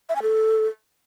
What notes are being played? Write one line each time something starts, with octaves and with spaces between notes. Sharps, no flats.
E5
G#5
A4